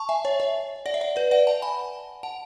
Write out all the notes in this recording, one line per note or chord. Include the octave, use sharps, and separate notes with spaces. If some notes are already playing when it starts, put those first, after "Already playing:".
Already playing: A5 C#6
E5 G#5
C#5 E5
C#5 E5
D5 F#5
E5
D5 F#5
B4 D5
D5 F#5
F#5 A5
G#5 B5
F#5 A5